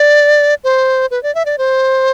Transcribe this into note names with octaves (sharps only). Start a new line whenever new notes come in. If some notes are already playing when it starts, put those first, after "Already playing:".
Already playing: D5
C5
B4
D5
E5
D5
C5